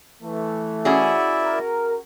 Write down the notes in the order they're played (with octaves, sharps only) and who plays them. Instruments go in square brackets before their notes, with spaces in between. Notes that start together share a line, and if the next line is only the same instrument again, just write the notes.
[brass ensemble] E3 A3
[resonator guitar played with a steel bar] C#4 F#4 G#4 [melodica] E4 D5 E5
[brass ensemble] A#4